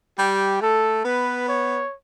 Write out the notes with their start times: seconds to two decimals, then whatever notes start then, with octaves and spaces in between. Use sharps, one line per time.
0.18 G3 G4
0.61 A3 A4
1.04 B3 B4
1.48 C#5